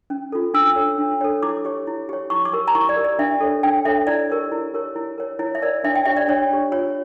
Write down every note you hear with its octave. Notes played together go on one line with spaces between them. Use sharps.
C#4
F4 A4
D4 E6
A4 C#5
D4
A4 C#5
E4 D6
G4 C#5
E4
G4 C#5
E4 C#6
D6
G4 A#4
A#5
E4 C#6
D5
G4 A#4
D5
D4 E5
A4 C#5
D4 G5
A4 C#5 E5
E4 D5
G4 A#4 C#5
E4
G4 A#4 C#5
E4
A#4 C#5
E4 C#5
E5
A#4 C#5 D5
D4 E5
G5
G4 C#5 E5
D5
D4 C#5
G4 C#5
F4 C#5